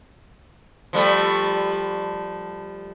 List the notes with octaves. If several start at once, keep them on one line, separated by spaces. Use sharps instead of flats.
F3 G3 A3